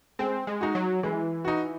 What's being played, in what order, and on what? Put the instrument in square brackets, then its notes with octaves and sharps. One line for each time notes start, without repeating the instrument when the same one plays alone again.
[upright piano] G#3 [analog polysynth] C4
[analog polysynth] G#3
[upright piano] D#4 F#4
[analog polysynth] F#3
[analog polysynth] E3 [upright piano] G#3
[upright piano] D#4 F#4